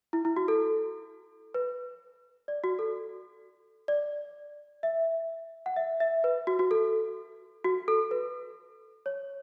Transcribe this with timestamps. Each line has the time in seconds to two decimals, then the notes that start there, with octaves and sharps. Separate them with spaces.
0.13 E4
0.25 E4
0.36 F#4
0.48 A4
1.54 B4
2.48 D5
2.64 F#4
2.79 A4
3.88 D5
4.83 E5
5.66 F#5
5.76 E5
6.00 E5
6.24 B4
6.47 F#4
6.59 F#4
6.71 A4
7.64 F#4
7.88 A4
8.11 B4
9.06 C#5